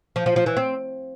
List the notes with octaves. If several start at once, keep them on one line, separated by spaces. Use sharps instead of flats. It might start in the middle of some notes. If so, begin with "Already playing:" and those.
F3
F3
F3
E3
C4